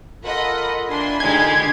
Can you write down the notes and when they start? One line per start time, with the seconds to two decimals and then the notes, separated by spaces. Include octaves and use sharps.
0.24 F4 A4 A#4 D#5 F#5 B5
0.88 A#2 E3 D4 G#5 B5 C6
1.20 A#2 D3 G#3 D#4 G4 G#6